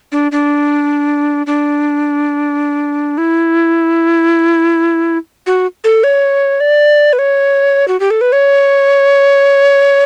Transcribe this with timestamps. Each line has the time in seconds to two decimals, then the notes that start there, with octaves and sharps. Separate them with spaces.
0.12 D4
0.32 D4
1.47 D4
3.18 E4
5.47 F#4
5.84 A4
6.04 C#5
6.60 D5
7.13 B4
7.19 C#5
7.88 F#4
8.00 G4
8.11 A4
8.21 B4
8.32 C#5